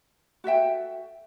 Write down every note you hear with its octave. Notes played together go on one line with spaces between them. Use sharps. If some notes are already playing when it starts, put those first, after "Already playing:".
F#4 A4 E5 G5